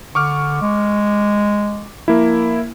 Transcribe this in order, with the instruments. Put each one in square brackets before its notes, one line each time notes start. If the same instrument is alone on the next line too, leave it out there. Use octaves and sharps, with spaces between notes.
[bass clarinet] D3 [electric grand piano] C#6 D6 F6
[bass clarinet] G#3
[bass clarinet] F3 [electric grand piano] A#3 E4